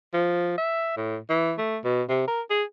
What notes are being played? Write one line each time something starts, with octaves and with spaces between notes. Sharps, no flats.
F3
E5
A2
E3
A3
B2
C3
A#4
G#4